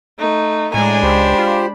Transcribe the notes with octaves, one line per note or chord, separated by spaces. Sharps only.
A3 D#4
A2 G#3 D4 G#5 A#5
C#2 G4 C5 B5
F4